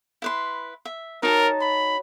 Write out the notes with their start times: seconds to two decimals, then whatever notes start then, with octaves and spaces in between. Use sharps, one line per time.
0.22 E4 B4 C6
0.85 E5
1.23 D#4 F#4 A#4 C#5 A5 A#5
1.61 B5